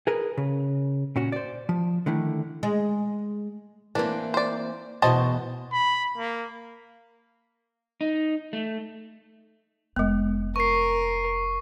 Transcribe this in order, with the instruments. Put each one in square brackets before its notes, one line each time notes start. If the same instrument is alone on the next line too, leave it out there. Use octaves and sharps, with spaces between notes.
[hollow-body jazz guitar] G#4 A#4 B4
C#3
A#2 C#4 F#4
C5 D5
F3
D3 D#3 A3 E4
[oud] G#3
[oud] E3 A#3 C4 [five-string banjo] D4
[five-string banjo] C5 D5
[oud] E2 B2 F#4 [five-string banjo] C5 D#5 A5
[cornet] B5
A#3
[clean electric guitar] D#4
A3
[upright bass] F1 [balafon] G#3 B3
[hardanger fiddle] A#4 [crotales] C#6 C7